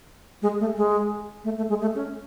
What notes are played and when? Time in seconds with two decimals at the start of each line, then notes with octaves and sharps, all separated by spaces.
0.42 G#3
0.60 A3
0.76 G#3
1.44 A3
1.57 A3
1.69 G#3
1.81 A3
1.95 C#4